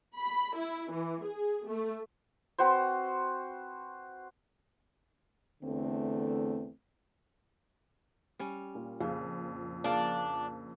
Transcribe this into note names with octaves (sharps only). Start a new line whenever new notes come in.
B5
E4
E3
G#4
A3
C4 F#4 B4 C5
E2 D3 A3 C4
G3 C#4
A#2
F2 A#2 C#3
C#3 F3 A#3 D4